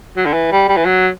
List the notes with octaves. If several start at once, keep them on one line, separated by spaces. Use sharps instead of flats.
F#3
D3
E3
G3
G3
E3
F#3